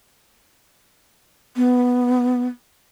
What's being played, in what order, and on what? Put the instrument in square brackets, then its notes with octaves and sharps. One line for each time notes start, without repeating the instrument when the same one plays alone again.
[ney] B3